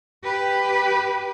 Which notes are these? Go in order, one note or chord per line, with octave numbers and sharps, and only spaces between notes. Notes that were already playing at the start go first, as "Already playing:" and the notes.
G4 B4